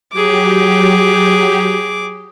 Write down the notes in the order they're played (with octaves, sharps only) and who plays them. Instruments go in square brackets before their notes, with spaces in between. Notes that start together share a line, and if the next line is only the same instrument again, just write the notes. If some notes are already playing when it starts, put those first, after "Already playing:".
[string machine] F#3 G4 [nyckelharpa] G#4 D6